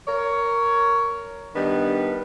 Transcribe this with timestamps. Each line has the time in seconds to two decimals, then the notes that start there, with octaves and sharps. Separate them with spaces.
0.08 A#4 C#5
1.55 D#3 G3 B3 D4